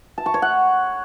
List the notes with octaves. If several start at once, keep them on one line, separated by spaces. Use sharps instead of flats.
A5
C#6
C#5
F#5